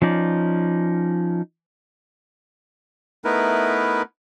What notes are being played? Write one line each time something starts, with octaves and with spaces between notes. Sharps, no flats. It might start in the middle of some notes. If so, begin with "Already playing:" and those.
F3 C#4 D#4 D5
A3 B3 D#4 E4 A#4 B4